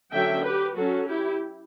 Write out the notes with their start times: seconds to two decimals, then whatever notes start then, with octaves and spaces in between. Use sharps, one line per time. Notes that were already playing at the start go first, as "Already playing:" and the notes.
0.12 D3 F#3 C#4 E5 G5
0.44 G4 B4
0.76 F#3 C#4 F#4 A4
1.07 E4 G4